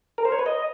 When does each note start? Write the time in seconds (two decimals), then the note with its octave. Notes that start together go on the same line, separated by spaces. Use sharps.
0.18 A#4
0.25 C5
0.32 C#5
0.39 B4
0.46 D#5